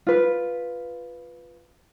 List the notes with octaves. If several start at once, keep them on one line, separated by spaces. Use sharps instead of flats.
F4 B4